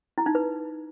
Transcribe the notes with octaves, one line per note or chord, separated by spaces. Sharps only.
E4
D#4
B4